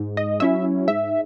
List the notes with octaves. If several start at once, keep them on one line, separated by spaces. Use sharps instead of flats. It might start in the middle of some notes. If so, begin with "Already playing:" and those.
Already playing: G#2
D#5
F#3 C#4 E4 E5
G#2 E5